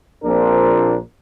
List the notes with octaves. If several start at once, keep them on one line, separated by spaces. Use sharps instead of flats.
A#1 A#2 C4 D4 A#4